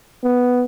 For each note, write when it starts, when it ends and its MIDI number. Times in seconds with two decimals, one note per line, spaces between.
0.24 0.64 59